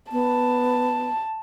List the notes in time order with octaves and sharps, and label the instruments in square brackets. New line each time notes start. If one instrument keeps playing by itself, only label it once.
[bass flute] B3 [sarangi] A5